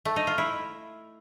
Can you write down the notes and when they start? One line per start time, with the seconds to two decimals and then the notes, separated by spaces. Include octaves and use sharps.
0.05 A3
0.16 D#4
0.27 F4
0.38 E4